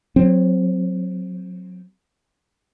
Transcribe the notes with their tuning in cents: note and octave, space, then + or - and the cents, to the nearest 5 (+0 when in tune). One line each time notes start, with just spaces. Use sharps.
F#3 -20 C4 +0